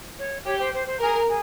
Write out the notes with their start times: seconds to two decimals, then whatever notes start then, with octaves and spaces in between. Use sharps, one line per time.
0.18 C#5
0.45 G4 C#5
0.59 C5
0.73 C5
0.86 C5
1.00 G#4 A#4
1.27 G#4